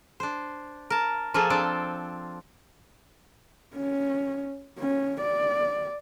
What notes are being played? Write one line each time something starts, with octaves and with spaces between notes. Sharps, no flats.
D4 C5
A#4 A5
F3 A#3 F4 G#4 A4
C4 D4 G5 A5
C#4
C#4
D5